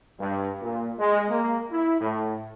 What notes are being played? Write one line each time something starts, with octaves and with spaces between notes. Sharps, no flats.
G2
A#2
G#3
A#3
E4
A2